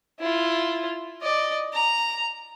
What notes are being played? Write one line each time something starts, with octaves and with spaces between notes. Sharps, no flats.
E4 F4
D5 D#5
A#5